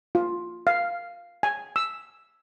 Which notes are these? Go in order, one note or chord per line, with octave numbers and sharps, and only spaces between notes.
F4
F5
G#5
E6